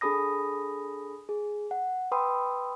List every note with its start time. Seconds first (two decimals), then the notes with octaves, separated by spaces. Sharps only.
0.01 D4 G#4 A4 B5 D#6 A#6
1.29 G#4
1.71 F#5
2.12 B4 G5 B5 C6 D#6 E6